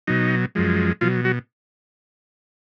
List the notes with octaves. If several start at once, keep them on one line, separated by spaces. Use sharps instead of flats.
B2 F#3 D#4
F#2 F3 G#3
B2 F3 F#3 F4
F#3 F#4